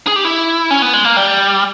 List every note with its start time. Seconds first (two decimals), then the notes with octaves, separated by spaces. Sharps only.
0.07 G#4
0.16 G4
0.25 E4
0.71 C#4
0.82 B3
0.93 G#3
1.05 A#3
1.17 G3